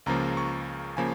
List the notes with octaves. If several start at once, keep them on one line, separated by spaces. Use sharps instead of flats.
C#2 C#3 F3 A#3 A#5
C#6
C#3 F3 A#3 G#5